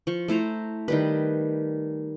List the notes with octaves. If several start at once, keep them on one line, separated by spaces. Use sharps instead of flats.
F3 C#6
A3 E4 C5 A#5
D#3 G3 B4